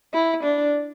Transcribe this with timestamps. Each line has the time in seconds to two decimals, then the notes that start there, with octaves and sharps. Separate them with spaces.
0.13 E4
0.43 D4